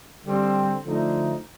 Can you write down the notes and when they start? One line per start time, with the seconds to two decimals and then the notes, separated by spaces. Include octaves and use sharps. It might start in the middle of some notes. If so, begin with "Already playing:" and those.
0.25 D3 G3 C4
0.84 D3 F3 A3 D#4